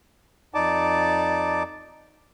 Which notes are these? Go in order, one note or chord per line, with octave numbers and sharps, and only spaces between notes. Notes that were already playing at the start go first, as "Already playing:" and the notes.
F2 D#4 D5 A5 D6